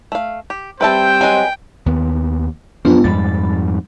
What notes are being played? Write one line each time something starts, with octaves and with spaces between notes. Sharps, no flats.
A3 F5
G4
G3 C4 B4 C5 E5 G5 A5
F#3 G#4 B4 D#5 G#5
D#2 B3
F#2 F3 B3 D4 F4
F2 G#2 G3 B5 A6